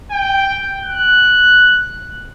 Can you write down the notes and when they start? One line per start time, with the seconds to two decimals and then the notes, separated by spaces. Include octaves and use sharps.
0.11 G5
0.85 F#6